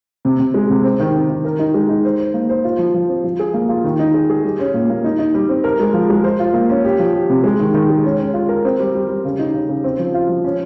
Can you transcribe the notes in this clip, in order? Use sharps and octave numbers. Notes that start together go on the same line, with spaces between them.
C3
C3
G#3
C3
C4
D#3
C4
D#3
A#4
D#4
G#3
D#4
C5
C5
A#3
C5
F4
F3
F3
C4
F3
G#4
A#3
F4
D#3
D#4
G#4
G#4
G3
C#4
A#2
A#3
D#4
D#4
G3
C4
A#4
G#3
F3
G#3
C5
F4
A#3
C#4
G4
F3
G4
C3
G#3
D#3
D#3
G#3
C#4
C#4
F4
A#4
C4
G3
G3
G3
C#3
D#4
C#3
C#3
C4
F3
F4
F3
C#4